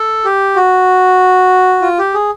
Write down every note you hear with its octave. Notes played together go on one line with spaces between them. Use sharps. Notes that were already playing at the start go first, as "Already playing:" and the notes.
Already playing: A4
G4
F#4
F4
G4
G#4